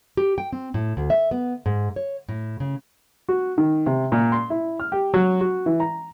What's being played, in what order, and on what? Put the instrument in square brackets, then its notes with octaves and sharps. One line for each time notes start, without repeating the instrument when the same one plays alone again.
[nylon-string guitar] G4
G5
C4
A2
D2
E5
B3
G#2
C#5
A2
C#3
[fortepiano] F#4
D#3
C3
A#2
C6
E4
F6
G4
F#3
F#4
E3
A#5